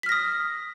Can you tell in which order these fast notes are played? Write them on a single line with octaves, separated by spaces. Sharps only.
B6 F6 A#6 D#6